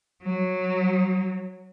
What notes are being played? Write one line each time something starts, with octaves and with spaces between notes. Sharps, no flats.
F#3